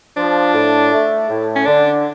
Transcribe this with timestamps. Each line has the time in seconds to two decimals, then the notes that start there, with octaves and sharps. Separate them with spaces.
0.17 F3 D4
0.54 A2
0.92 A3
1.29 A2
1.56 C#4
1.66 D3 D4